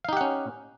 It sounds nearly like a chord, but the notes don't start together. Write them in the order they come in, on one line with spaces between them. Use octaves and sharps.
F5 D#4 G4 F#5 C#4